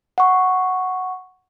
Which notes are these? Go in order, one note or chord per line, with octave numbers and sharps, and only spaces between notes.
F#5 C#6